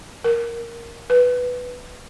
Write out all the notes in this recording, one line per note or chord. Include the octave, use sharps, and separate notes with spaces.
A#4
B4